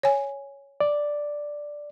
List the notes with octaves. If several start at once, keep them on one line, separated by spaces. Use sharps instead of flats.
C#5 G#5
D5